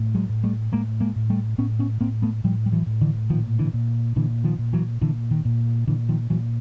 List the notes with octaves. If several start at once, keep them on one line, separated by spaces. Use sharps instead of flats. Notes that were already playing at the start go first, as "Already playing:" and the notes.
Already playing: A2
F#3 G#3
A2
G3 A3
A2 G#3 A#3
G#3 A#3
A2
G3 A3
A2 B3 C#4
B3 C#4
A2 A#3 C4
A3 B3
A2 F3 G3
G3
E3 F#3
A2
D3 E3
A#2 D#3 F3
D3 E3
A#2
A#2 D3 E3
D#3 F3
A#2
E3 F#3
A#2 D3 E3
D#3
A#2
A#2 D3 E3
D#3 F3
A#2 E3 F#3